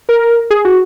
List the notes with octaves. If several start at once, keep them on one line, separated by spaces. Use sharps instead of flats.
A#4
G#4
F#4